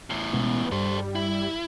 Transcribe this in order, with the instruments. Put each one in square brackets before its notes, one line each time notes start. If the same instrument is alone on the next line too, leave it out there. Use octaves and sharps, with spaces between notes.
[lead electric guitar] E2 A2
[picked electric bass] B2 G#3 C#4 [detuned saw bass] B3
[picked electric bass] G2 [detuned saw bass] G3 [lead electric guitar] A4 C5
[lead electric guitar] E4